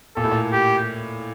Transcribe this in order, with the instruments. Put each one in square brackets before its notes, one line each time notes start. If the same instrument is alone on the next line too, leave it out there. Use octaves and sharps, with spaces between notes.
[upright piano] A#2 [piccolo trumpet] A4
[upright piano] A2
A#2
[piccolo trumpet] G4